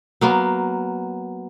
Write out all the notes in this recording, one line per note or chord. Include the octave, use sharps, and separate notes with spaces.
F#3 A#3 B3